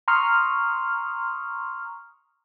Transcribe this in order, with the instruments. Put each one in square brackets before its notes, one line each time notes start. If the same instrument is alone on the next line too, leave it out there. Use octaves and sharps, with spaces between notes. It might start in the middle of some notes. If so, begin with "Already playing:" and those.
[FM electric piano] A#5 C6 C#6 D#6 F6